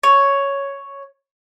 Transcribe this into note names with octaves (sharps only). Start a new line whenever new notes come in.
C#5